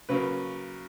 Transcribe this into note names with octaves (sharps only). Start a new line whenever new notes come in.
C#3 F#3 A#3 B4